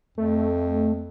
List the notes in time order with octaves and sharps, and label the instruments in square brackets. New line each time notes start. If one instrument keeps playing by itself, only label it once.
[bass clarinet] F2 [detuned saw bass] A3